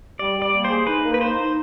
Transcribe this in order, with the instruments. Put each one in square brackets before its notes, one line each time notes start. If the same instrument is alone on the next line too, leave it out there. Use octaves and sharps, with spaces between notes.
[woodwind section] G3 [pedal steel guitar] D5
[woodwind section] G3
[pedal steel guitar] D5
[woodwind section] A#3
[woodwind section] G#4 [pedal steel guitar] C5
[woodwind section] D#4 [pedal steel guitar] B4
[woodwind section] A#3
[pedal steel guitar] B4
[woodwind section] D#4 [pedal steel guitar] C5
[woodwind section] D#4